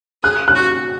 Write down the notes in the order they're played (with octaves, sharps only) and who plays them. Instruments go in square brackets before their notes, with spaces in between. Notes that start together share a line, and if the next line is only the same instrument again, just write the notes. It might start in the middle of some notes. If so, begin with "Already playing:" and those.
[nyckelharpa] G#4 [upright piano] F#6
[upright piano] F#6
[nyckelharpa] F#4